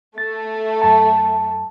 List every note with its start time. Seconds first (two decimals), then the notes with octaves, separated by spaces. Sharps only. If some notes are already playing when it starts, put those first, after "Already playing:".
0.18 A3 A6
0.82 F#2 A5